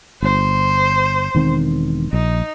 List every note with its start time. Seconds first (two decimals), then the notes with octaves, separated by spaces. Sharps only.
0.23 G1 C5
1.35 E1 D#3 C4
2.13 A#1 D#4